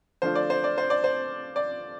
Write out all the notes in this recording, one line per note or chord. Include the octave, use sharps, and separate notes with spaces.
D3 F3 A3 D4 F4 C5
D5
C5
D5
C5
D5
C5
D5